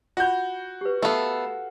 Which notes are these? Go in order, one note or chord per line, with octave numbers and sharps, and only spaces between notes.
F4 F#4 B5 G6
G4 B4
A3 B3 A4 F5